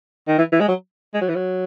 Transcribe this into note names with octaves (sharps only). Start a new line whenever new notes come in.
D#3
E3
E3
G#3
F#3
G#3
F#3
E3
F#3